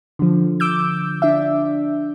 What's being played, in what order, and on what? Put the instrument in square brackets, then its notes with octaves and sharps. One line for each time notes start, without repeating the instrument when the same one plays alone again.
[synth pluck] D3 F3
D6 E6 G6
D4 E5